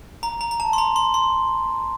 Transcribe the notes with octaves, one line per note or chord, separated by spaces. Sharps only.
A#5
A#5
A#5
A5
C6
A#5
C6
C6